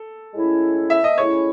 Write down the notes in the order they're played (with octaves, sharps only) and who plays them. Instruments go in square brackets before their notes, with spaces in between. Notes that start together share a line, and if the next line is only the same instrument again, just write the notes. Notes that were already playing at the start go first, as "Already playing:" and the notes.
Already playing: [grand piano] A4
[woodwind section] A2 G#3 C#4 E4
[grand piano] E5
D#5
[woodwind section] A2 G#3 C#4 E4 [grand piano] C#5